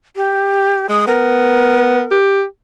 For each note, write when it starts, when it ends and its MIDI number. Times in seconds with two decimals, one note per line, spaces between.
0.16 0.89 67
0.89 1.05 56
0.89 1.04 87
1.07 2.04 59
1.07 2.18 70
2.11 2.44 67